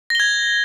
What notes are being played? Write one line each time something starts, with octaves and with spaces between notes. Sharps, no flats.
G#6 A#6 G7